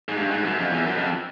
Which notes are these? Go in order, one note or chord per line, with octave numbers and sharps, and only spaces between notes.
G#2
G2
G#2
F#2
F2
E2
F#2
F2